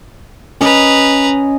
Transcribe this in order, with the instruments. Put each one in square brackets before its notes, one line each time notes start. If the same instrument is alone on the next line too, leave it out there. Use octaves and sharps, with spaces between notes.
[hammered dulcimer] C#4 D#5 [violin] B4 A#5